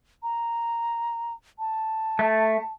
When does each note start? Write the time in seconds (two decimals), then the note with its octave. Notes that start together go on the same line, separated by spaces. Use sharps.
0.23 A#5
1.59 A5
2.19 A3